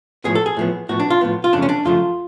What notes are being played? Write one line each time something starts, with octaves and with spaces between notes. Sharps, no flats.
A2 F3 B3 G#4
A4
G#4
A2 F3 B3
A2 F3 B3 F#4
D4
F4
A2 F3 B3
F4
F#2 C#3 F3 A3 D4
C#4
D4
F#2 C#3 F3 A3 F4